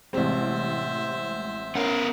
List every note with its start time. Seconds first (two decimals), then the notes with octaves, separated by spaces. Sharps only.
0.13 A1 C3 G3 G#3 C4 C5 E5
1.75 B3 C#4 A#4